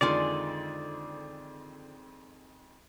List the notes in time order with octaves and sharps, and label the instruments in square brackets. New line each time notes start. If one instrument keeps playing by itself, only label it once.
[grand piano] F2 D#3 G#3 [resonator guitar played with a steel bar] D3 F4 G#5 [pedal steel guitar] D5